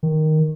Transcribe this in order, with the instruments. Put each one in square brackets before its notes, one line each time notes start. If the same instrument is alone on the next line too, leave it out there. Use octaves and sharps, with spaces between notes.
[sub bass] D#3